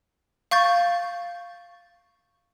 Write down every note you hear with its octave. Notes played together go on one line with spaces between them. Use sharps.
F5 C#6 G6 A6